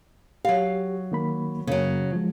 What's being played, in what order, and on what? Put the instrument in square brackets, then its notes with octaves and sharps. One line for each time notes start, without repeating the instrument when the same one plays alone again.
[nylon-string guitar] F#3 F5 [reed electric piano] G4
[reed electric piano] D#3 A#3 B5
[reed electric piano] F#2 A#3 [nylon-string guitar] C#3 F#3
[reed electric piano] F3 G#3